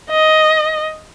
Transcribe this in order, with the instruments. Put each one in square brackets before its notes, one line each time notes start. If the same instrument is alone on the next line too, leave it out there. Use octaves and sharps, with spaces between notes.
[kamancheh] D#5